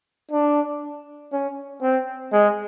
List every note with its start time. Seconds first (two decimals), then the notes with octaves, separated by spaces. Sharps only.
0.31 D4
1.32 C#4
1.82 C4
2.32 G#3